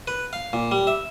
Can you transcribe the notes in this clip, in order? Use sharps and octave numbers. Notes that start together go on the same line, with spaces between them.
B4
F5
A#2
G3
E5